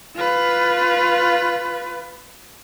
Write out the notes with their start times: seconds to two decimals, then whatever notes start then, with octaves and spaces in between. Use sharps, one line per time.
0.16 F4 B4